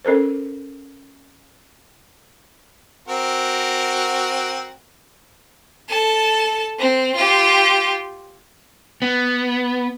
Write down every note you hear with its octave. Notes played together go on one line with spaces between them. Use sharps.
C#4 A4 A#4 C5
C4 F#4 A#4
A4 A5
C4
F4 G4
B3